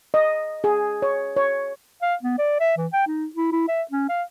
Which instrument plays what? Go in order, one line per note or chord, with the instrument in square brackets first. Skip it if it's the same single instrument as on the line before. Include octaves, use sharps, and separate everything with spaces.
[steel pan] D#5
G#4
C#5
C#5
[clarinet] F5
B3
D5
E5
E3
G5
D#4
E4
E4
E5
C#4
F5